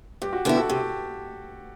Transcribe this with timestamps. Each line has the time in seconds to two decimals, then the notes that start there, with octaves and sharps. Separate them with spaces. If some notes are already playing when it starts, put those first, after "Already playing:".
0.22 G2 G4
0.33 F#4
0.45 D3 G3 B3 E4 G4
0.57 F#4 A4
0.70 C3 G4